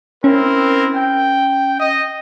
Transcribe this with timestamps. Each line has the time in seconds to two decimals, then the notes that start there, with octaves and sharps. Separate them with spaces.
0.24 C4 C#4 E4 A#4
0.94 G5
1.80 D#5